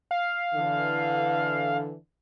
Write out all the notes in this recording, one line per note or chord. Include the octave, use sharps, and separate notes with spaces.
F5
D3 E3